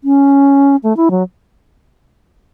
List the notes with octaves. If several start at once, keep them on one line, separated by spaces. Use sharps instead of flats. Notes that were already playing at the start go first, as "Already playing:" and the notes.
C#4
A3
E4
F#3